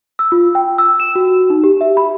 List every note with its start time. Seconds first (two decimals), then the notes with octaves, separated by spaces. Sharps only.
0.19 E6
0.32 F4
0.55 G5
0.78 E6
1.00 E7
1.15 F#4
1.50 D#4
1.64 G4
1.81 E5
1.97 B5